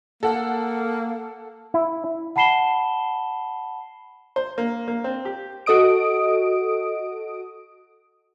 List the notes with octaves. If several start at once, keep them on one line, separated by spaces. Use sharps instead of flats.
A#3 A4 F#5
E4
F#5 A5 B5 C7 E7 G7
C5
A#3
A#3
C4
G4
F#4 A4 D#5 D#6 D7